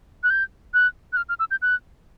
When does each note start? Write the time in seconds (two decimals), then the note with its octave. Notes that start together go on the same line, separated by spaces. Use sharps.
0.23 F#6
0.30 G6
0.74 F#6
1.13 F#6
1.17 F6
1.29 F6
1.40 E6
1.51 G6
1.62 F#6